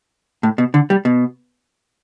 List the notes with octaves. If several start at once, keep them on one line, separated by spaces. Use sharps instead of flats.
A2
B2
D3
G3
B2